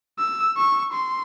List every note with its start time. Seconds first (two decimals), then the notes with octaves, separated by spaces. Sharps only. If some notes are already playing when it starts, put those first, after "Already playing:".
0.19 E6
0.57 C#6
0.93 C6